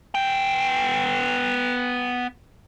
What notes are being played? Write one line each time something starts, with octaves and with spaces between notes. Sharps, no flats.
B3 G5